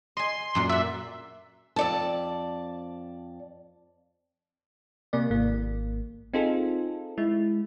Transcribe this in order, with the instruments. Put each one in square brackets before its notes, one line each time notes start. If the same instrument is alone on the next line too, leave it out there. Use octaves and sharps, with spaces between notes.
[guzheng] D#5 G#5 [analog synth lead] C6
[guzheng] F#2 A#2 F#5
[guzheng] D5 F#5 [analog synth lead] E5
[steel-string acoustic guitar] F2 D5 A5
[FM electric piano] C3 A#3 D5
G#1 A#3
C4 D#4 F4 G#4 A4
G#3 E4